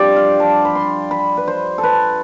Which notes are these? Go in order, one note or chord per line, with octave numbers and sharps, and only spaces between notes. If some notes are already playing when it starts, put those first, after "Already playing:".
Already playing: G2 F3 C4 D5 G5
F5
A5
B5
C6
B5
B4
C5
A4
B4